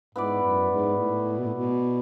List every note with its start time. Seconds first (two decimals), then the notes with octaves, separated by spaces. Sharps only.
0.15 G#2 B3 E4 B4 D5
0.43 F#2
0.70 G#2
0.97 A2
1.38 B2
1.46 A2
1.55 B2